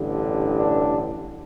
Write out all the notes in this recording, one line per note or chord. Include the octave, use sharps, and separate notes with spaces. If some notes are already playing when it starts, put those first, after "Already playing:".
Already playing: A1 G2 D3
D4